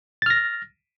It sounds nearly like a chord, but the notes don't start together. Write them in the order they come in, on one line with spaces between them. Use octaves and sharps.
A6 F6 A#6